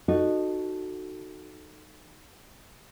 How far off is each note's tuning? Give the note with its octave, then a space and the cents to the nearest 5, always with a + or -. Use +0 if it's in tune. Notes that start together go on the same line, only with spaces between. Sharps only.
D#4 -20 F#4 +0 A4 +0